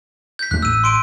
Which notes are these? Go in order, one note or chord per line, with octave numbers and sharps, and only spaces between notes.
G6 B6
E2 A3 F#6
A1 E6 D#7
C6 D7 D#7